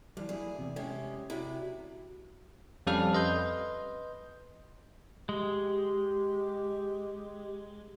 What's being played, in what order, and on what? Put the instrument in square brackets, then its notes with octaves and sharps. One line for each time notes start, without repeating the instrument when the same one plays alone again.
[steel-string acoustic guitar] G2 [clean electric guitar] E3 G3
[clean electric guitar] F#3 A#3 E4 [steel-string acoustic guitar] G#4
[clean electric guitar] E2 C3
[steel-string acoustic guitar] C3 C#4 [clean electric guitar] G#3 G4
[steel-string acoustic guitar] C3 F#3 [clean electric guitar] E4 F#4
[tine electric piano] F2 G3 C#4 A4 F5 F6
B4 D#5 C6 G6
[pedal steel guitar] G#3 [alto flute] G4